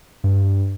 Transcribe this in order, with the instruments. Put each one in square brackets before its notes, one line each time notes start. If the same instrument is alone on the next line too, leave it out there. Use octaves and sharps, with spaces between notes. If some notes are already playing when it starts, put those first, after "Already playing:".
[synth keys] G2